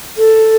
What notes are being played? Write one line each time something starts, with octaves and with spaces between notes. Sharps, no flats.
A4